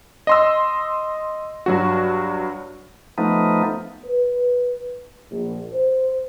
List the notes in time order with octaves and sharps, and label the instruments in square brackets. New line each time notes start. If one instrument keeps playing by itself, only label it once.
[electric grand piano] D#5 C6 E6
G2 F#3 F#4
[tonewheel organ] F3 A3 B3 D#4
[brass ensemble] B4
A#1
C5